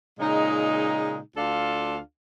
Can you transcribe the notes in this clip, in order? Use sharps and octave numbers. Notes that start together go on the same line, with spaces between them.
A#2 C#3 G#3 D#4
D2 D4 F4 A4 F5